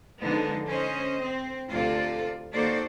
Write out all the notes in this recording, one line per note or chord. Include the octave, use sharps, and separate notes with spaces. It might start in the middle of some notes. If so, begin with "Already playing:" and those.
D3 F3 G#3 B3 D4 D#4
C#4 C5 D#5
C4
D2 C3 F4 A4 D5
D#3 A#3 F#4 A4 C5 D5